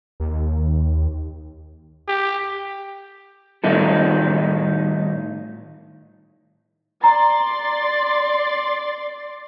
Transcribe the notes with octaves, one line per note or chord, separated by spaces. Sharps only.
D#2
G4
A2 D#3 G3 D#4 A4
D5 A#5 C6 A6